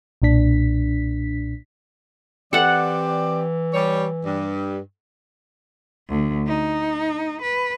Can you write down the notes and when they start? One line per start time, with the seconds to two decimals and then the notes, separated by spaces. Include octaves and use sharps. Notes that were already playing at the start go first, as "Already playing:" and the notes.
0.22 B1 A#2 D4 B6
2.53 E3 C4 G4 A4 D5 F#5
3.74 G3 C#5
4.25 G2
6.09 D2
6.47 D#4
7.41 B4